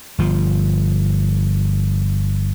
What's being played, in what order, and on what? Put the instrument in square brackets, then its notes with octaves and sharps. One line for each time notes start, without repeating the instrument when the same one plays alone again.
[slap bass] G1 F3